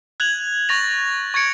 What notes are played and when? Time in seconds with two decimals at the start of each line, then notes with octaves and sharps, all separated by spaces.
0.20 F#6 G#6 F7 F#7
0.69 C#6 A6 A#6 F7
1.34 C#6 G#6 A6 C#7 D7